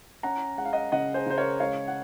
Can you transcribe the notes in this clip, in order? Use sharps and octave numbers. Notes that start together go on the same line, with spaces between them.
C#4 F#5 A#5
G#3 F#5
F5
D#5 F#5
C#3 D#5 F#5
G#4 C5
C#3 C5
A#4 C#5
G#3 C#5 F5
F#5